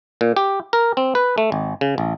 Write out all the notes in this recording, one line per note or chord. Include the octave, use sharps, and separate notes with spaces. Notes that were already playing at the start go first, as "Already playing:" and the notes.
A#2
G4
A#4
C4
B4
A3
G#1
C#3
A1